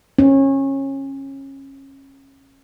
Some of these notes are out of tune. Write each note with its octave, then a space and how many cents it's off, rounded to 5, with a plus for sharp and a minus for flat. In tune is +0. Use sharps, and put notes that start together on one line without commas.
C#4 -25